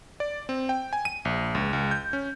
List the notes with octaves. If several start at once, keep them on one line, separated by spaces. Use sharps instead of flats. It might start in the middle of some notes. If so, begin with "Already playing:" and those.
D5
C4
G5
G#5
D#7
A#1
C#2
C#2
G6
C#4